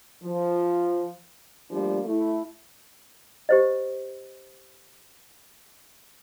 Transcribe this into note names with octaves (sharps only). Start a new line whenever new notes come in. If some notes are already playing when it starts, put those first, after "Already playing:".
F3
F3 G3 A3 A#3 D4
A3 E4
G4 C5 D#5